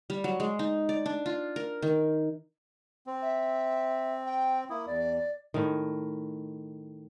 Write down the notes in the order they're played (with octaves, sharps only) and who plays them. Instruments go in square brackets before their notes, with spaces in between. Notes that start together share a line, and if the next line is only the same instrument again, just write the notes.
[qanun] G3
F#3
G#3
D#4
D5
D4
F4
A#4
D#3
[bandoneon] C4
[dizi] E5
G5
[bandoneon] A#3 E4 [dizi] D#6
[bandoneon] E2 [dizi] D5
[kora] A2 D#3